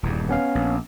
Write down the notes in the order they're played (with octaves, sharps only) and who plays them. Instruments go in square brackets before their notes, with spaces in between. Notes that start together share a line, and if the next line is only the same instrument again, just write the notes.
[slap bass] D#1 E2 G2
[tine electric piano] B3 C#4 F5
[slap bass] A#1